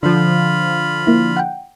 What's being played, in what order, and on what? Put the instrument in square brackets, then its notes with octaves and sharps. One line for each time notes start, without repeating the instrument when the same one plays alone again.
[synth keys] D3 F3 [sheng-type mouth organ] F4 B5
[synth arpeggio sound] A#3 E4
F#5 G5